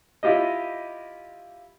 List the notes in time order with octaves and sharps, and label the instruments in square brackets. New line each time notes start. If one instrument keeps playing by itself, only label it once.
[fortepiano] E4 F4 G4 D#5